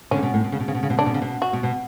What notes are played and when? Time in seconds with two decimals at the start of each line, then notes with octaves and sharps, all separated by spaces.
0.11 B2 D3 C#4
0.17 C#3
0.23 B2
0.34 A2
0.44 B2
0.52 C#3
0.60 B2
0.68 C#3
0.75 B2
0.83 C#3
0.90 B2
0.98 C#3 D4
1.06 B2
1.14 C#3
1.22 B2
1.42 F#4
1.53 B2
1.63 B2